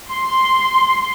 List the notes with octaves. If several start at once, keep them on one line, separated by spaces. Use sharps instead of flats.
C6